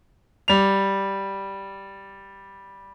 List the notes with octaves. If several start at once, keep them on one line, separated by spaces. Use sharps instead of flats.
G3 F7